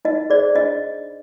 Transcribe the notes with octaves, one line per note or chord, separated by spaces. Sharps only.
D#4 D#5
G#4 C5 D5
D4 D#5